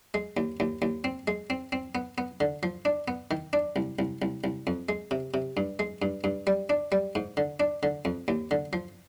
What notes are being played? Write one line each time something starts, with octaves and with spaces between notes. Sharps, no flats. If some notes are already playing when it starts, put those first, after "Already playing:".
G#3
D#2
D#2
D#2
C4
G#3
C4
C4
B3
B3
D3
F3
D4
B3
D#3
D4
C2
C2
C2
C2
F2
G#3
C3
C3
G2
G#3
G2
G2
G3
D4
G3
G#2
D3
D4
D3
F2
D#2
D3
F3